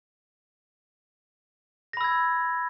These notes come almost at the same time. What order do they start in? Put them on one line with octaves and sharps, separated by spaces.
A#6 B5 E6 G#6